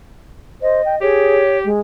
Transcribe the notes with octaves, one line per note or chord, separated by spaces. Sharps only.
C5 D#5
G5
G4 G#4 C#5
G#3